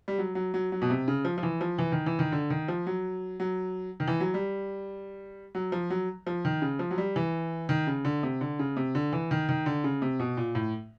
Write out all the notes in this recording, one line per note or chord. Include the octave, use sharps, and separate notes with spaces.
G3
F#3
F#3
F#3
F#3
B2
C3
C#3
F3
F3
E3
F3
E3
D#3
E3
D#3
D3
D#3
F3
F#3
F#3
D#3
E3
F#3
G3
F#3
F3
F#3
F3
D#3
C#3
F3
F#3
G3
E3
D#3
C#3
D3
C3
D3
C#3
C3
D3
E3
D#3
D#3
D3
C#3
C3
B2
A#2
A2